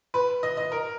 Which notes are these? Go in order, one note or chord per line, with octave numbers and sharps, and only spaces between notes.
B4
D#5
D#5
A#4